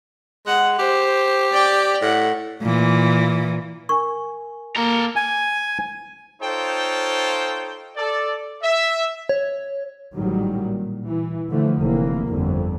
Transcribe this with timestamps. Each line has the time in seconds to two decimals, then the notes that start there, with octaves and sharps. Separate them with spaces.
0.46 G#3 F#5
0.78 G4 C5
1.51 D5 G5
2.02 A2 F#5
2.62 A#2 E3
3.89 A#4 G#5 C#6
4.76 A#3 A4 A#5
5.16 G#5
6.41 D#4 F4 A4 C5 C#5 G5
7.97 A4 D5
8.63 E5
9.29 C#5
10.15 A1 G#2 D#3 F#3 G3
10.60 A#2
11.07 E3
11.50 D3 E3 F3 A3
11.81 F1 E3 A#3
12.28 G1 F2 D3